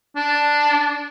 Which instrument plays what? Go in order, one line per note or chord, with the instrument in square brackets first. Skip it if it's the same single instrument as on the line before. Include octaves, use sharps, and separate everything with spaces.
[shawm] D4